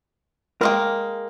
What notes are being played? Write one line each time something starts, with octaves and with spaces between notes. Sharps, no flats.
G3 G#3 A#3 A#4 G5